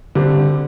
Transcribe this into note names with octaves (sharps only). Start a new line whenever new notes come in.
D3 G3 C4